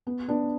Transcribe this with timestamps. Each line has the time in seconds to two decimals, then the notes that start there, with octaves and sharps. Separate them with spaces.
0.07 B3
0.28 B3 D4